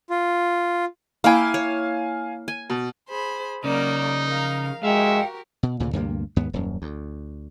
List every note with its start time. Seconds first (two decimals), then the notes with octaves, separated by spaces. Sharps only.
0.10 F4
1.24 A#3 E4 F5 G5 G#5
1.54 C#5
2.48 G#5
2.70 B2
3.09 G#4 C5 B5
3.64 C#3 F#3 A#3 D#4 D5
4.26 F3 A#4 F5
4.83 G#3 F#4 G4 A#4 E5 F5 G5
5.63 B2
5.80 D2 A#2 C#3
5.93 D2 G2 C3 A#3
6.36 D#2 G#2 B3
6.53 D#1 F#2
6.82 D2